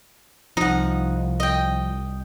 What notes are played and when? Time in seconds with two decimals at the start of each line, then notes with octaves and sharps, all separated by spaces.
0.57 C2 F3 D#4 F#5
1.40 D#5 G5